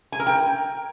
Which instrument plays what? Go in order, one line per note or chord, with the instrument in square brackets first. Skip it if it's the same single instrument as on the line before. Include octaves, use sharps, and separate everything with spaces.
[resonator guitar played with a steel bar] G#5
A#4
G5